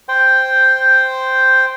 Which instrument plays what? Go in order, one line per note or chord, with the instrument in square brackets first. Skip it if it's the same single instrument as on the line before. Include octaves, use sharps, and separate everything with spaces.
[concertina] C5 G5